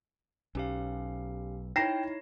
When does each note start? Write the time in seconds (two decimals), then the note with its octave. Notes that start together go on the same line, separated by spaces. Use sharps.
0.55 B1 C#4 G4 F5
1.76 D#4 E4 C#5 G5 A#6 C7 E7